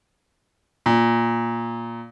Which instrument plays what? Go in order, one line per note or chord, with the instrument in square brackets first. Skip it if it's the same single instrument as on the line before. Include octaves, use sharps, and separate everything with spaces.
[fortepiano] A#2